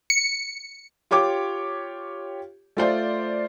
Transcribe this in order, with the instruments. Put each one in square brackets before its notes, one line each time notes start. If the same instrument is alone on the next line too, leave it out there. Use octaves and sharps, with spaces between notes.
[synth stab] C#7
[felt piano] F4 G4 C#5 D6
A3 F4 C5 D5